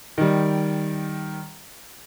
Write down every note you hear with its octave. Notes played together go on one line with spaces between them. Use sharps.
D#3 G3